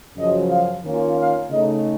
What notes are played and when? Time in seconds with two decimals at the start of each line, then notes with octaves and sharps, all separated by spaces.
0.17 F#2 C#3 F3 D#5
0.50 F5
0.84 D#3 A#3 C#4 F4
1.17 F5
1.50 C#3 A3 D#4 D#5